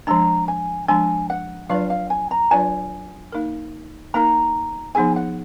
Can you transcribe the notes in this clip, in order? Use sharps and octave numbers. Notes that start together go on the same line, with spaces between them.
F3 G#3 D4 A#5
G#5
F3 G#3 D4 G#5
F#5
F#3 D4 F4 B4 D5 F5
F5
G#5
A#5
F#3 D4 F4 B4 D5 G#5
A#3 D#4 A#4
A#3 D#4 A#4 A#5
F3 B3 D#4 G#4 G#5
F#5